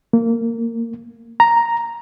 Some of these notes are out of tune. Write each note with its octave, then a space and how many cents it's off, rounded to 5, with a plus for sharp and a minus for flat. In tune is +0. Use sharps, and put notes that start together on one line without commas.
A#3 -20
A#5 +0